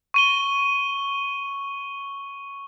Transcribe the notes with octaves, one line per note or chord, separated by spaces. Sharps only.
C#6 D#7 G7